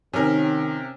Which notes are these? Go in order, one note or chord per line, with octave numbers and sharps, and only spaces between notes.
C3 D#3 C#4 A#4